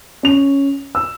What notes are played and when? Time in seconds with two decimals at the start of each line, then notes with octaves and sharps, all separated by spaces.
0.23 C#4 F7
0.95 E6